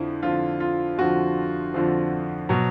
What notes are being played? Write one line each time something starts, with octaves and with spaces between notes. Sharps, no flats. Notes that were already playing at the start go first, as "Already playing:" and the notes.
Already playing: F2 D3 F3 E4
F2 D3 F3 F4
F4
F2 D3 F3 F#4
F2 D3 F3
B2 F#3